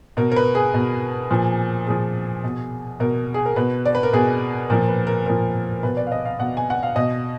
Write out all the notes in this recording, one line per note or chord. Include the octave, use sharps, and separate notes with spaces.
B2 A#4
A#4
B4
G#4
B2
A#2 F3
A#2 F3 G#4
B2
B2 A#4
G#4
A#4
B2 B4
D5
B4
A#4
B2 G#4
A#2 F3 A#4
B4
A#4
A#2 F3 A#4
B2 B4
D5
F5
D#5
F5
B2 F#5
G#5
F#5
F5
B2 D#5